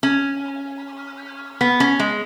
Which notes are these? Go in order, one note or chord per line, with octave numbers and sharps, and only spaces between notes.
C#4
B3
C#4
G#3